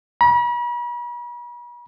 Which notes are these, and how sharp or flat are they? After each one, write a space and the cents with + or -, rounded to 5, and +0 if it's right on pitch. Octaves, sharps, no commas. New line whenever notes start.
B5 -45